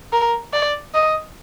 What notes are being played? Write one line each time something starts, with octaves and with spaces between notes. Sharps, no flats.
A#4
D5
D#5